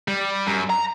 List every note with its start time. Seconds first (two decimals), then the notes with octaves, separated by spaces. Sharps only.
0.08 G3
0.47 F#2
0.70 A#5